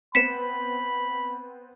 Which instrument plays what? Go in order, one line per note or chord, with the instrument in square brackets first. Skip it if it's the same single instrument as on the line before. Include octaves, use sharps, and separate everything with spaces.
[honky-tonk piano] B3 C4 [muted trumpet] B5 [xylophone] B6 C#7 E7